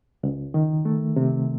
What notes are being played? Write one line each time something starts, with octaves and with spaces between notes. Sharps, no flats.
C#2
D#3
A3
C3